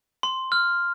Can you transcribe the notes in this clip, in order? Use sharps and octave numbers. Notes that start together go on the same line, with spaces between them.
C6
F6